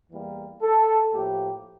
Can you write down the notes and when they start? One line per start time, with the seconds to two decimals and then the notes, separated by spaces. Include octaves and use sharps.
0.10 E2 E3 G3 A#3
0.61 A4
1.14 A2 F3 A#3 G4